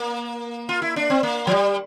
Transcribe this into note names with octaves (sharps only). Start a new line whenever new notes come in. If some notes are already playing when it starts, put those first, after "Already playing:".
Already playing: A#3
F4
E4
D4
C4
A#3
F3
G3